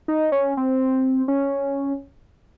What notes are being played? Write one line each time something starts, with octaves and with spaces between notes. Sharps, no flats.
D#4
C#4
C4
C#4